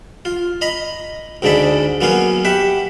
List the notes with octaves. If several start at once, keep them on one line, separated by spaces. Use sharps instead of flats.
F4
D#5 A#5 B5
D2 G#2 C#3 A4 D5 B5
F#3 A#3 B3 C#4 C#5 F5
G4 E5 F#5 B5